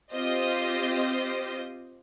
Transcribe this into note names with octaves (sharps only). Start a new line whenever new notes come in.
C4 F4 G4 C5 D#5